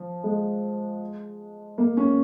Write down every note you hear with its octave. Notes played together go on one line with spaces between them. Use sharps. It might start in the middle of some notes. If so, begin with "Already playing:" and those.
Already playing: F3
G#3
A#3
C#4